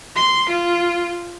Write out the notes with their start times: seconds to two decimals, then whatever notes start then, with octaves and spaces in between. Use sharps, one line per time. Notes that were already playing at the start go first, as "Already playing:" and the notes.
0.16 C6
0.50 F4